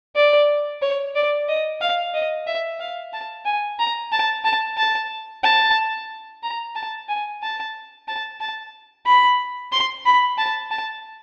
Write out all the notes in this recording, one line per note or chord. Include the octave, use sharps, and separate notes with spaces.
D5
C#5
D5
D#5
F5
D#5
E5
F5
A5
G#5
A#5
A5
A5
A5
A5
A#5
A5
G#5
A5
A5
A5
B5
C6
B5
A5
A5